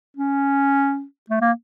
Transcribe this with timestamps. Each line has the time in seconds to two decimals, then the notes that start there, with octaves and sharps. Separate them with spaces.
0.16 C#4
1.30 A3
1.41 A#3